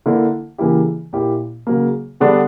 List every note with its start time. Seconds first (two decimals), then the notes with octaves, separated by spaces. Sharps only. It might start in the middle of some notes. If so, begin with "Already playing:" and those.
0.06 D3 A#3 E4
0.58 C#3 E3 A#3 E4 G4
1.13 A#2 A#3 E4 G4
1.67 C#3 F#3 A#3
2.20 D3 G3 B3 D4